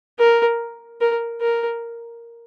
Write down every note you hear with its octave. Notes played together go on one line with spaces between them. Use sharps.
A#4
A#4
A#4